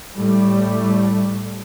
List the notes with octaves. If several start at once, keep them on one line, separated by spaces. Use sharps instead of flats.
A2 G3 A3